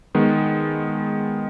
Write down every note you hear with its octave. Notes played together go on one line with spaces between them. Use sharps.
D#3 G#3 B3